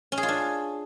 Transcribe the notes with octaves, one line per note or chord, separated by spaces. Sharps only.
C#4
G#4
F4
D4